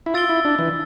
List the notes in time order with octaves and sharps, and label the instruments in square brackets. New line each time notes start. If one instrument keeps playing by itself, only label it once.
[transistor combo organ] E4
[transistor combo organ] F4 [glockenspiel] E6 A6 D7 G7
[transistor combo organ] E4
D4
E3